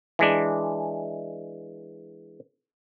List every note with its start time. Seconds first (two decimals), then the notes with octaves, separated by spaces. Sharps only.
0.19 E3 G#3 D4